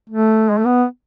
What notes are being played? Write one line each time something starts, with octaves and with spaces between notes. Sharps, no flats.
A3
G#3
A3
B3